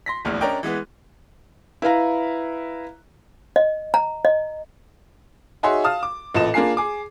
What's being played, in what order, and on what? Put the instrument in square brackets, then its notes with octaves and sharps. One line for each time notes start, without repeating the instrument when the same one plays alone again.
[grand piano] C6 A#6 B6
D1 A#1 E2 A2 F6
C#4 D4 A#4 D5 D#5 G5
E3 G#3 B3
[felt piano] E4 B4 F5 A#5
[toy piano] D#5
A#5
D#5
[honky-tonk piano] D#4 F#4 G#4 C#5 E5 C6
F5 A5 D#6 F6
D6
A1 A#2 A4 D#5 E7
A#3 D4 F4 G#4 C7
G#4 D6